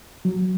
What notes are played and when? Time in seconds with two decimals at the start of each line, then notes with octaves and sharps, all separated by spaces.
0.25 F#3